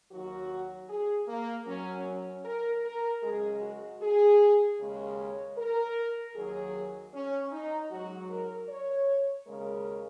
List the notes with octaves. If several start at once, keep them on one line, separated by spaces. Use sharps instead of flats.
D#2 D#3 F#3 F#4
G#4
A#3
F#2 F#3 C#4
C#4
A#4
A#4
F#2 C#3 G#3 G#4
F#4
G#4
D#2 C#3 G#3
C#5
A#4
D#2 D#3 F#3 G#4
C#4
D#4
G#2 F#3 F#4
A#4
C#5
D#2 C#3 G#3 A#4